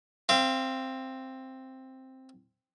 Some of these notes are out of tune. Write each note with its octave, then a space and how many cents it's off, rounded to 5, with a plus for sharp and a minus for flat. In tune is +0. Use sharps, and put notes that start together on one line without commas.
C4 +5 F5 -30